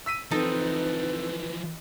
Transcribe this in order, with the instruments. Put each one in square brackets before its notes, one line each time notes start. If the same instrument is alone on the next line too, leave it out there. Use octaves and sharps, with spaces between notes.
[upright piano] E6 B6 D#7
[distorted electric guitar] E3 F3 [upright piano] C4 A4 [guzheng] D#4 [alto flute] B4